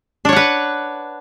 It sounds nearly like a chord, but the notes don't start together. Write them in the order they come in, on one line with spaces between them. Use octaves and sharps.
D4 C#5 F#5 B4